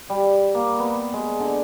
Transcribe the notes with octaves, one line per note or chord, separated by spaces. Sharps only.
G3
A#3
B3
G#3
D3